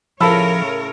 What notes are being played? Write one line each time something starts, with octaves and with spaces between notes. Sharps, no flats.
A2 C#3 F3 A#4 C#5 A5 B5 E6